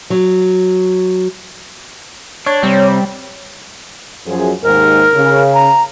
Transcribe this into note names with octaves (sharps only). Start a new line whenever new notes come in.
F#3
D4 C#5
C3 G3 C4
F#2 F3 G#4
D#2 G#2 A#4
C#3
A#5